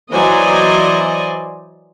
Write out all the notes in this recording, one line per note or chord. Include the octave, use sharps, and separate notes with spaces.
E3 F#3 C5 D5 D#5 G#5